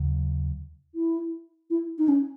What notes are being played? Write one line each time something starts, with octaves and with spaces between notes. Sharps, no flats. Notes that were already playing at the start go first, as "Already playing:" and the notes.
Already playing: D#2 C#3 F#3
E4
E4
D#4
C#4